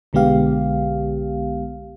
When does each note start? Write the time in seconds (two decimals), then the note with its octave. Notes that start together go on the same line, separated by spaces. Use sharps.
0.13 B1 D3 G#3 B3 G4 F5